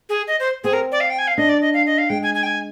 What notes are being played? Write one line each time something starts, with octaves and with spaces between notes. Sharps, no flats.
G#4
D#5
C5
C4 G#4
A#4
D5
F5
G5
G#5
F5
D4 D#5
D5
D#5
F5
D#5
F5
G#3 G5
G#5
G#5
G5
G#5